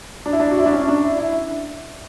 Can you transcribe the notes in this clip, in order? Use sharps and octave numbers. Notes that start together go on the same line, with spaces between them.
D4
E4
D4
F#4
E4
D4
C#4
D4
E4
E4